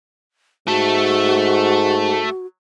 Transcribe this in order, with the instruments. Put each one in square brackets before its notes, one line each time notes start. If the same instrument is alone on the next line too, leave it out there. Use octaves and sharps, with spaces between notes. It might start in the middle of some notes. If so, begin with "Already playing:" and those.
[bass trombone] G#2 [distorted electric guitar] A3 A4 [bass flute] F#4